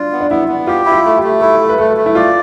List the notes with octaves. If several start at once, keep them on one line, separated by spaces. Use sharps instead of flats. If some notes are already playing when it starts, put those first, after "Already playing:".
Already playing: D4 F4
B3
D4
B3 E4
B3
F4 G4
E4
F4
A3
G4
A3
E4 A4
A3
B4
A3 A4
A3
E4
F4 D5